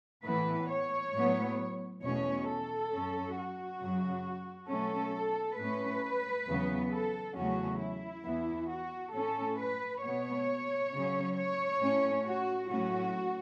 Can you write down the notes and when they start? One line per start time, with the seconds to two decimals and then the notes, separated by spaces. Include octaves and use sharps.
0.24 A2 E3 B3 B4
0.70 C#5
1.14 A2 F#3 B3
2.02 E2 B2 A3 C#4 C#5
2.48 A4
2.92 F#2 F#3 C#4
3.36 F#4
3.81 F#2 C#3 F#3
4.69 B2 F#3 A3 C#4 A4
5.58 A2 A3 C#4 B4
6.48 E2 C#3 F#3 B3
6.91 A4
7.36 E2 C#3 F#3 A3 C#4 F#4
7.80 E4
8.25 E2 E3 B3
8.69 F#4
9.14 A2 A3 C#4 A4
9.59 B4
10.03 B2 B3 C#5
10.91 C#3 F#3 C#4
11.37 C#5
11.81 A2 A3 C#4
12.26 F#4
12.69 A2 F#3 C#4 F#4